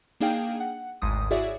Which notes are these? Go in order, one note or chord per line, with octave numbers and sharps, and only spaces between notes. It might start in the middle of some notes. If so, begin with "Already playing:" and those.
A#3 D4 D#4 G#4 F5 G5
F#5
G#1 D2 G#2 D#6
E4 F#4 G#4 C#5 D5 E5